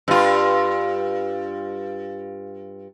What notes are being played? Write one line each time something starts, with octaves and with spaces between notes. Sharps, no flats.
G2 F4